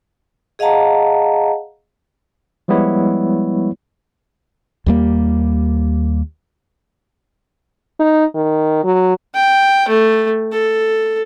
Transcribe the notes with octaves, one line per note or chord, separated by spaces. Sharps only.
G#4 D#5 F5 F#5 A5 A#5
F3 G3 G#3 B3 E4 C#5
D#2 G3 A#3
D#4
D#3
F#3
G5
A3
A4